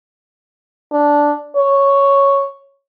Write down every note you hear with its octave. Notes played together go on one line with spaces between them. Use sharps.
D4
C#5